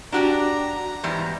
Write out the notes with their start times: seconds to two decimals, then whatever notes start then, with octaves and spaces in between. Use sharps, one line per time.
0.12 D4 F#4 G4 A#5
1.03 E2 G#2 G3